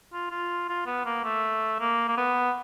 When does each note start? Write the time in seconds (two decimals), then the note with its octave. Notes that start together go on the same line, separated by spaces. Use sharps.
0.13 F4
0.31 F4
0.69 F4
0.86 B3
1.06 A#3
1.24 A3
1.80 A#3
2.08 A#3
2.17 B3